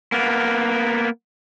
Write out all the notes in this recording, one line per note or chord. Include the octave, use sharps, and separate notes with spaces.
A#3 B3